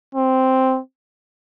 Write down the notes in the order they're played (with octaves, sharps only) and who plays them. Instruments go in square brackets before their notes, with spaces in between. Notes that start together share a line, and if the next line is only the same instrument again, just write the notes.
[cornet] C4